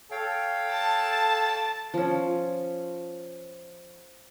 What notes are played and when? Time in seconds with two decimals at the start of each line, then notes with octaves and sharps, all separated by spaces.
0.11 A4 C#5 F5 G5
0.71 A5
1.94 F3 C#4